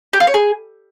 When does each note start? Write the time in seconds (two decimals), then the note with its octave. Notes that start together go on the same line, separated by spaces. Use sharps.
0.13 G4
0.20 F4
0.27 C#5
0.34 G#4